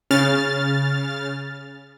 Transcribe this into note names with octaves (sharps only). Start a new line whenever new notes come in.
C#3 F6 A6